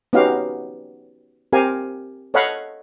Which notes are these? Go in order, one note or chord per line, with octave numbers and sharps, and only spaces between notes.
B3 C#4 D#4 F#4 G4 F5
C4 G4 A#4 F5 G#5
A4 C#5 D#5 F5 F#5 B5